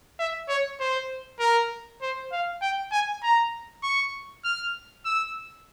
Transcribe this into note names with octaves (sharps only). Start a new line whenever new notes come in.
E5
C#5
C5
A#4
C5
F5
G5
G#5
A#5
C#6
F6
E6